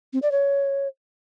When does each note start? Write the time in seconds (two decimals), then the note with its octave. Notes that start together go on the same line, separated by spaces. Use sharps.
0.13 C4
0.22 D5
0.32 C#5